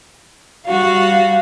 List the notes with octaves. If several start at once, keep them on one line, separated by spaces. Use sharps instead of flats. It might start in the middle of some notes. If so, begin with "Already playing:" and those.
G3 F#4 F5